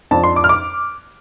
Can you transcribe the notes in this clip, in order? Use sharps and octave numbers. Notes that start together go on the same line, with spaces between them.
F2 F3 D4 A5
C6
D6
F6
D6